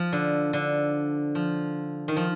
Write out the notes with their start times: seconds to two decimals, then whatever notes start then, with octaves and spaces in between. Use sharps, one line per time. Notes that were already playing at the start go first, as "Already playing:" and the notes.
Already playing: F3
0.12 D3
0.53 D3
1.35 F3
2.08 D#3
2.16 F3